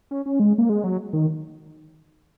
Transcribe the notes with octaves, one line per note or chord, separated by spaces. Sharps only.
C#4
C#4
G#3
A#3
G#3
F#3
D#3